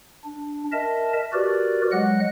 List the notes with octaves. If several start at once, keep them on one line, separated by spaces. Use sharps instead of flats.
D4
A#4 D#5 E5 A5
F#4 G4 A#4 B4 D5
F#3 G#3 D#5 F#5 F#6